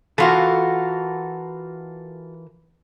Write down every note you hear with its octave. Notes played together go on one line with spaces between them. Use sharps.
E3 F4 F#4 A4 A#4